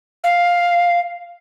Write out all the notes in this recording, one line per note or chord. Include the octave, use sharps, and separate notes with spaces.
F5